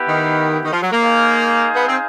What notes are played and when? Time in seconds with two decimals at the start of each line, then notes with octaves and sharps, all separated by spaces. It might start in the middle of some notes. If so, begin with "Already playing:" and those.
Already playing: B3 E4 G4 B4
0.08 D#3
0.65 D#3
0.73 F3
0.82 F#3
0.92 A#3
1.01 D#4 G#4 C5 F5
1.75 B3
1.88 C4